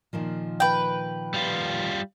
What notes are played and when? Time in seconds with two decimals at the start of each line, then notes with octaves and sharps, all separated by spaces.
0.13 A#2 D#3 F3
0.60 B4 G5
1.34 G3 F4